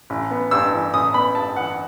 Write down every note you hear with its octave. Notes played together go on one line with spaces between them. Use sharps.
A1
B3
G2 E6
E3
A1 D#6
B3 B5
G2 A5
E3 F#5